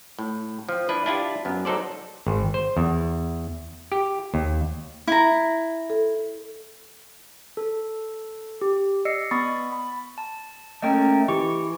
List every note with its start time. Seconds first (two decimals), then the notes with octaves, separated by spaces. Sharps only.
0.19 A2
0.69 F3 C4
0.89 D4 E4 B4
1.06 D4 E4 F4 G4
1.45 F#2 B3
1.65 F#3 D#4 A4 C5 D5
2.27 G#1
2.54 C5
2.77 E2
3.92 G4
4.34 D#2
5.07 E4 A#5
5.90 A4
7.57 A4
8.61 G4
9.05 D5 D#5 E6 C7 C#7
9.31 B3 B5 C#6 D#6 A6
9.48 A6
9.72 B5
10.18 A5
10.82 A3 A#3 C#4 D#5 G5
11.28 E3 G4 C#6